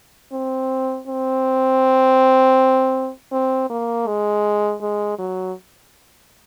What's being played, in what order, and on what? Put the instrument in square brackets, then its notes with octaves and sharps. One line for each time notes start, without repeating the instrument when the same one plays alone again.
[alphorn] C4
C4
C4
A#3
G#3
G#3
F#3